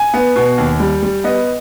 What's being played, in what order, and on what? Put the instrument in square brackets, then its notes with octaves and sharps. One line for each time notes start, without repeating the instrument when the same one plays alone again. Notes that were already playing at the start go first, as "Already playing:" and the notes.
Already playing: [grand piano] G#5
B3
B2
D#2
G3
G3
B3 D#5